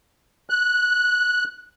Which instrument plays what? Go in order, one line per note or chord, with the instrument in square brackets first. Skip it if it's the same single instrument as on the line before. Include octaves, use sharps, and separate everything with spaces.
[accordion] F#6